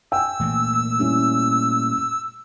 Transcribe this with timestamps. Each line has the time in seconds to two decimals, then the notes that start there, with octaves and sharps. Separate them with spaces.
0.12 G5 G#5 E6
0.40 A#2 E3 A3
0.99 G3 C#4 E4